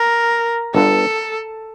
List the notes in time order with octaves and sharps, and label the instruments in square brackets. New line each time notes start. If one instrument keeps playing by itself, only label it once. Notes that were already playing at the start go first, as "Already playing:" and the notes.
Already playing: [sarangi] A#4
[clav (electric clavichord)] G1 G2 D3 [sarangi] A4